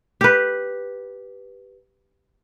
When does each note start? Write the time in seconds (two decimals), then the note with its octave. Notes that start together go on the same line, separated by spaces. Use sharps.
0.21 G4 B4